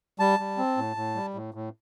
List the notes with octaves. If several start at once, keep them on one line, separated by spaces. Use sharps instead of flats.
G3 A5
G3
C4
A2
A2
G3
A2
A2